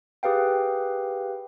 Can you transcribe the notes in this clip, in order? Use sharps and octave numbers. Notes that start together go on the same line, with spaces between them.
G4 G#4 B4 F5 G5